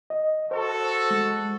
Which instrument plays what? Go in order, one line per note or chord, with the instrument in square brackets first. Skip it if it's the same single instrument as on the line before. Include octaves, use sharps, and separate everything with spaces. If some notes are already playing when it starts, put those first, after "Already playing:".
[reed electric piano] D#5
[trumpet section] F#4 A4 [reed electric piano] C5
[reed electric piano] G#3